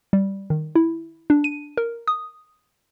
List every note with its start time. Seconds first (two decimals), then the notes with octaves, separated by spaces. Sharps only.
0.13 G3
0.50 D#3
0.75 E4
1.30 D4
1.44 D#7
1.77 A#4
2.08 D#6